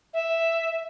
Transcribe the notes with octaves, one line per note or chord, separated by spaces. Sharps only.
E5